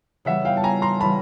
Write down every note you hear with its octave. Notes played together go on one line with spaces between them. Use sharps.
C#3 E3 G3 E5 F#5
F5 G5
A5
G#5 A#5
A#5 C6
C#3 E3 G3 A5 B5